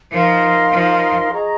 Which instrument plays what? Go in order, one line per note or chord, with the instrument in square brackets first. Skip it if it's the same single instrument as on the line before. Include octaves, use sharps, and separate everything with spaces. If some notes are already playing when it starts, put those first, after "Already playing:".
[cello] F3 [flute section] D#4 A#4 F5 C6
[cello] F3
[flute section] G#4 D#5 A#5 C#6